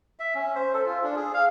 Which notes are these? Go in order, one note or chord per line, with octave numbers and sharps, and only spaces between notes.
E5
C#4
C5
A4
F4
D4
G#4
F5